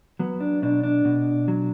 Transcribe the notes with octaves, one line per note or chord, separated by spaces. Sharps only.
F#3 B3
D4
B2 D4
D4
B2
F#3